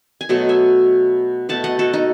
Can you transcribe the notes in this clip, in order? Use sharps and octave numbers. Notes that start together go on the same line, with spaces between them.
G#5
B2 F#3 A3 D#5 F#5
E5 G#5
B2 A3 F#5 A5
D#5 F#5
F#4 A4
D#4 F#4